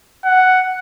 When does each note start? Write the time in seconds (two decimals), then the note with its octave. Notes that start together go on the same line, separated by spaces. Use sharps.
0.25 F#5